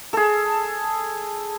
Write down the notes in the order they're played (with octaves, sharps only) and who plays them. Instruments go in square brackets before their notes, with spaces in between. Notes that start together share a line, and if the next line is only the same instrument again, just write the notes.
[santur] G#4 A4